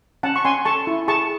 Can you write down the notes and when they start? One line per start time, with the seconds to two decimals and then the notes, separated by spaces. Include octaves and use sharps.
0.23 C#4 F#5 A5
0.36 C#6
0.45 C#4 G#5 C6
0.65 A4 A5 C#6
0.87 E4
1.08 G#4 A5 C#6